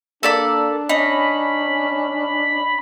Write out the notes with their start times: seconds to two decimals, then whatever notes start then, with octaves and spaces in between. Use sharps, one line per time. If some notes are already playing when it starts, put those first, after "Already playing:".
0.23 A#3 D4 A4 D5 B5
0.89 C#4 D#4 B5